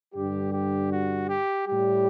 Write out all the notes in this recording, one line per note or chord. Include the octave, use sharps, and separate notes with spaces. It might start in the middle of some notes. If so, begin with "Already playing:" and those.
G2 D3 G3 G4
G4
F#4
G4
A2 G3 G4